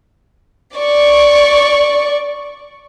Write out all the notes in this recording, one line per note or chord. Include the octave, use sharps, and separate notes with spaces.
D5 C#6